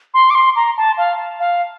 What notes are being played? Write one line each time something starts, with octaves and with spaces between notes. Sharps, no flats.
C6
D6
C6
A#5
A5
F5
F5